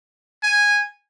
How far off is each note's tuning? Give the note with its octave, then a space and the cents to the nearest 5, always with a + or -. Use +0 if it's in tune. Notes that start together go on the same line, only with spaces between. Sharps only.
G#5 -10